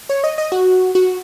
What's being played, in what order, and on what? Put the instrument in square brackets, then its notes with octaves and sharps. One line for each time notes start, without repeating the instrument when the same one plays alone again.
[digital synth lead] C#5
D#5
D#5
F#4
F#4